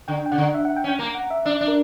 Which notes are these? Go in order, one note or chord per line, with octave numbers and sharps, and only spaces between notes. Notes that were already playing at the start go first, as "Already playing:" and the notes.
D3 G5
G5
C#3 F#5
D3
E5
F#5
G5
C#4
G5
A#3 A#5
F#5
E5
D4 E5
D4
A#4